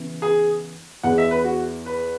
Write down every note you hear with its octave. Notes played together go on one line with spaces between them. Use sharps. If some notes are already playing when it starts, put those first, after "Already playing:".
Already playing: C#3 E3 B3
G#4
E2 E3 B3 G#4 F#5
E5
B4
F#4
B4